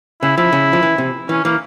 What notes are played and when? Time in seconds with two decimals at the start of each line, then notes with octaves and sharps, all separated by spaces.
0.22 C#3 E4
0.37 F3 E4
0.53 C#3
0.73 F3
0.83 E3
0.98 C3
1.29 E3 C#4
1.44 E3 A#3